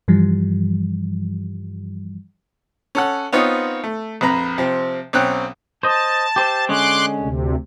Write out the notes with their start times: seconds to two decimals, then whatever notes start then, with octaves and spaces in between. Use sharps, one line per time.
0.08 G2 E3 F3 G3
2.95 C#4 A4 F#5
3.33 B3 C4 D#4 F4 C#5
3.84 A3
4.21 A#1 F2 B4 A#5
4.58 C3 F3 C4
5.13 B1 C4 C#4 G5 F#6
5.83 C5 D#5 A5
6.36 G4 C5 E5
6.69 D3 G#3 C#4 C6 D6 F#6
7.19 D2 C3